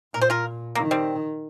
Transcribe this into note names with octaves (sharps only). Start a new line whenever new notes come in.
A#2 A#4
C5
F4 A#4
D#3 A#3
G3 C4